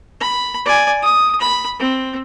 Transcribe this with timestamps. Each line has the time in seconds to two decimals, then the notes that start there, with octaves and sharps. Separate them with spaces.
0.21 B5
0.65 D5 G#5
1.03 D#6
1.41 B5
1.79 C4